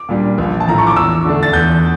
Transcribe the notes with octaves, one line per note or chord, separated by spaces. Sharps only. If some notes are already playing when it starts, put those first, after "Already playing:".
Already playing: D6
A#2 G3 D4
A#1
A5
A2 F3 A#5
C#6
D6
E2 E6
D3 A3 D4
A6
E2 G6